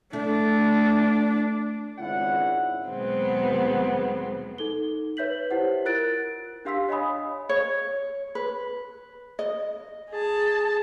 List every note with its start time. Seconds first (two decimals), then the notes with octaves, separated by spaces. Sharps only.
0.13 A3 D4
1.98 G#1 C#2 C#4 E4 D5 F#5
2.87 D#2 B2 F#3 G#3 B3 C4
4.58 D#4 A4 G7
5.17 B4 C#5 E5 G6 B6 F#7
5.51 E4 G4 C5 F#5
5.85 F4 A#4 F#6 A6 D7
6.65 D4 G4 F5 C6 E6 B6
6.89 C#5 D#5 F5 G#5 B5 D#6
7.49 C#5
8.35 B4
9.39 D#5
10.10 G#4 A5